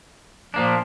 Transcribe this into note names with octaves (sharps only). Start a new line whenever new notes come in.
A#2 F3 A#3 D4